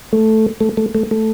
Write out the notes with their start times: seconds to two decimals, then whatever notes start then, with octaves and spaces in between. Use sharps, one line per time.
0.13 A3
0.61 A3
0.77 A3
0.95 A3
1.11 A3